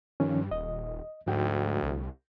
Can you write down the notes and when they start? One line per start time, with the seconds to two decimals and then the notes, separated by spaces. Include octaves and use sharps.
0.20 G2 D#3 F3 C#4
0.51 D#1 D#5
1.27 D2 G#2 F3 F#4 G5
1.83 C2